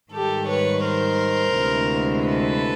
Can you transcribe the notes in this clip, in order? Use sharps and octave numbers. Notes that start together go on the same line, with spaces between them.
G#2 D#3 G3 G4 A4
B4 C#5
A#4 C5
D2 C3 E3 G#3
A4 B4